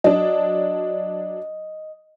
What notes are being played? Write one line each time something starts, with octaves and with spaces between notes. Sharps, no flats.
F#3 D4 D#5